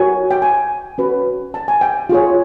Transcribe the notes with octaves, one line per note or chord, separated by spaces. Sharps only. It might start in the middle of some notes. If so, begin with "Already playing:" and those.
Already playing: F#4 A#4 C#5 G#5
G5
G#5
C#4 F#4 B4
A5
G#5
G5
F4 G#4 C#5